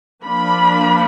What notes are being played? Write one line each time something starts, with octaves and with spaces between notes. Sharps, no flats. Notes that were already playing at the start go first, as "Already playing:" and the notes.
F3 A#3 D4 B5